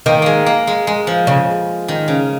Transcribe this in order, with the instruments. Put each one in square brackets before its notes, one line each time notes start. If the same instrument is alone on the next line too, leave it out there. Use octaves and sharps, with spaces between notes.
[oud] D#3 [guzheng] A#3
[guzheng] G#3 A#3
A#3
G#3
G#3
F3
[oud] C#3
[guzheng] D#3
C#3